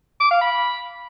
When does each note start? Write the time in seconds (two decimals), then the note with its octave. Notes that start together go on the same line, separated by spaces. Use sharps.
0.20 D6
0.31 F5
0.41 B5